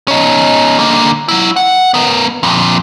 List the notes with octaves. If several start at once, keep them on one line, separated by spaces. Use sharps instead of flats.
C#4 D#4
D3 A#3
F#3 E4
F#5
B3 A#4
F2 A#2